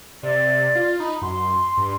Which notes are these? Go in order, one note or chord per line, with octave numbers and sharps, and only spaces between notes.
C3 D5
F4
D#4 B5
F#2 C6
G2